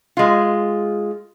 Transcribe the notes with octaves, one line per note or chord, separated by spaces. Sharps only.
G#3 F4